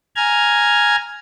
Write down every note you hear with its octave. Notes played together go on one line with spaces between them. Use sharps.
G#5 A#5 F6 G#6